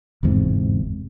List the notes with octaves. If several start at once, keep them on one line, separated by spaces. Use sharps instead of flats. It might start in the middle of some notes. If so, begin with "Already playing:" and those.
G1 E2 G#2 C3